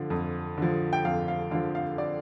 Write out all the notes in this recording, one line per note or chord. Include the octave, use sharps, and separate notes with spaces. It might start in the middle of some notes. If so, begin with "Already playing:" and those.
Already playing: D3 F3
F2
D3 F3
G5
F2 F5
F5
D3 F3 F5
F5
D5